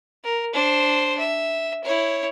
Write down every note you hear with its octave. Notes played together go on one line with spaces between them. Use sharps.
A#4
D4 C5
E5
E4 C#5